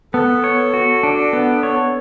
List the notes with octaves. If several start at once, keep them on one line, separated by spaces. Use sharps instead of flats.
B3 A4
C#5
F#4
D4
B3
C#5